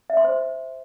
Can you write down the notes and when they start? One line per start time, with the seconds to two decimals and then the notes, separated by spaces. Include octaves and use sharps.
0.10 E5
0.17 C6
0.24 C5